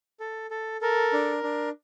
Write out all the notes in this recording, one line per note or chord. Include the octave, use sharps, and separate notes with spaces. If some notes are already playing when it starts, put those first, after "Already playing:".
A4
A4
A4 A#4
D4
D4